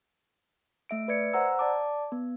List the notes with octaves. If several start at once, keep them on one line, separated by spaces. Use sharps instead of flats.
A3 E5 D7
B4 D5 E5 G#6 C#7
C5 F#5 A#5 E6
D5 A5 D6
B3